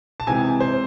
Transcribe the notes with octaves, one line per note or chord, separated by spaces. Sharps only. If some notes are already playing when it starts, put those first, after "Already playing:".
A5
C3 E3 G#3 C4 G#5
C5